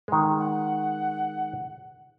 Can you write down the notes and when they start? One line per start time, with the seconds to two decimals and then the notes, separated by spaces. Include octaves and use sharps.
0.08 D#3 G#3
0.38 F#5